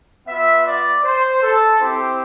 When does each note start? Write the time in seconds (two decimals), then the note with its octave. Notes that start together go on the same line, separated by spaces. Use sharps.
0.28 B3 F4 E5
0.66 D5
1.04 C5
1.43 A4
1.80 C4 E4 G4 C5